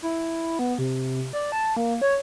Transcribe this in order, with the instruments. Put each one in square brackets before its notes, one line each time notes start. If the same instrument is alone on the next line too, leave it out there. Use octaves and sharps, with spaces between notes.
[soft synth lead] E4
B3
C3
D5
A5
A#3
C#5